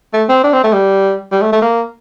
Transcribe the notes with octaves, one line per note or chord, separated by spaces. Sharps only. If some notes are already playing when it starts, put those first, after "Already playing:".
A3
C4
D4
C4
A3
G3
G3
A3
A3
A#3